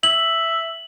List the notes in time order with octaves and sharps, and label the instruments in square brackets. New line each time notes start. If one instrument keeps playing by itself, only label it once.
[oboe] E5 [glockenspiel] F#7